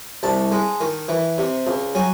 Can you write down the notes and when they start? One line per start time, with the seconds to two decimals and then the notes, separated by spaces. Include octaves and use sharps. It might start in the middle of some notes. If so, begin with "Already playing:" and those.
0.23 C2 A5
0.52 G#3
0.80 D#3
1.08 E3
1.38 C3
1.67 C#2
1.95 F#3 G#5